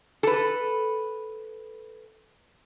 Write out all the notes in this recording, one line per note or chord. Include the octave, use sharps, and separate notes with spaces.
A4 B4